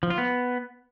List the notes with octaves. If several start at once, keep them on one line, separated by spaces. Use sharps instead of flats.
F3
F4
B3